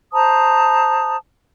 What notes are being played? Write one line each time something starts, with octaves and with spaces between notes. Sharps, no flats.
C5 A5 A#5 D#6